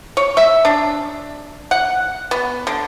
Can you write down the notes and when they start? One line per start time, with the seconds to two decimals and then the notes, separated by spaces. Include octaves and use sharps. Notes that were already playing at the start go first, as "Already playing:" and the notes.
0.17 C#5
0.37 E5
0.65 D4
1.71 F#5
2.31 B3
2.67 D3